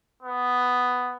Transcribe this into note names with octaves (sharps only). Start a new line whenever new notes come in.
B3